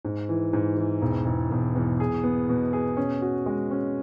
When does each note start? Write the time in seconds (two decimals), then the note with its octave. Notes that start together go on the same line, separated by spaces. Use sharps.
0.05 G#2
0.29 E3
0.53 G#2
0.77 E3
1.02 E1
1.26 E1
1.51 E1
1.75 E2
2.00 G#4
2.23 B3
2.49 B2
2.73 G#4
2.97 C#4
3.22 F#4
3.46 G#3
3.71 C#4